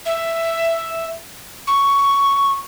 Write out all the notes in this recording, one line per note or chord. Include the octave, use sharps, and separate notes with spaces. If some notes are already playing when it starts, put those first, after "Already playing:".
E5
C#6